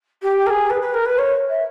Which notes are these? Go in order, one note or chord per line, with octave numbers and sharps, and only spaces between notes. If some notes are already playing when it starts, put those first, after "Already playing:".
G4
A#4
G#4
B4
B4
A#4
B4
C#5
E5